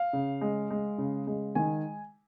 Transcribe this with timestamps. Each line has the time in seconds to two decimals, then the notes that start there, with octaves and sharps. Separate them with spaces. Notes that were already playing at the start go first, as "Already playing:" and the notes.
Already playing: F5
0.13 C#3
0.41 G#3
0.70 G#3
0.98 C#3
1.27 G#3
1.55 D#3 G#5